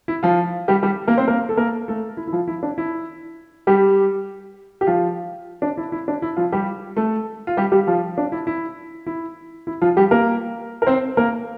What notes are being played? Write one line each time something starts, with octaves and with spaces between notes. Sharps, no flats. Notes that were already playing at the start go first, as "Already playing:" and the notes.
E4
F3 F4
G3 G4
G3 G4
A#3 A#4
C4 C5
A#3 A#4
A4
A#3 A#4
A3 A4
E4
E4
F3 F4
E4
D4
E4
G3 G4
G4
F3 F4
D4
E4
E4
D4
E4
F3 F4
G3 G4
A3 A4
F4
G3 G4
G3 G4
F3 F4
D4
E4
E4
E4
E4
F3 F4
G3 G4
A#3 A#4
A#4
C4 C5
A#3 A#4